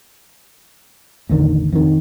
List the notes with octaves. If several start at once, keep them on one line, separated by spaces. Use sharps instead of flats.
A1 E2 D3 D#3
F2 D#3